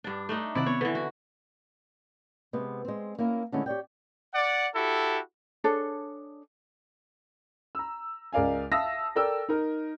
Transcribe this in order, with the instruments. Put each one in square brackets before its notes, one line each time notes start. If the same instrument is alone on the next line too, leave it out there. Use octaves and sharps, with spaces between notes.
[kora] G2 D4
A3 D4 D#4
[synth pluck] C3 D#3 C4 [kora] E4 D5 F#5
[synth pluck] B3 [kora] C#5
[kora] D3 E3 [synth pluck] B4
[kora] F#4
[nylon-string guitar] C3 G#3 B3
G#3 C4
A#3 C#4 E4 A#4
D3 D#3 G#3 A3 C#4 E4
G4 C#5 D5 G5
[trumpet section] D5 F#5
E4 F#4 G4 A4
[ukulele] D4 G#4 A4 C#5
[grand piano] A#5 E6
C#2 A#4 D5 F5 G#5
E5 F5 A5 D#6 E6 A#6
A4 A#4 D5 G5 E6
D#4 A#4